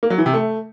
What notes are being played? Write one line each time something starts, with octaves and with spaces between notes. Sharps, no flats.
A#3
F#3
E3
C3
A3